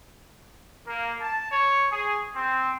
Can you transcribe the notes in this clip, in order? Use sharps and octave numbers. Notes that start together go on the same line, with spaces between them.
A#3
A5
C#5
G#4
C4